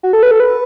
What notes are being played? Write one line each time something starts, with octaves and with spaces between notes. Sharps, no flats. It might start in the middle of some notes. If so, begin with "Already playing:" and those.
F#4
A4
B4
A4
B4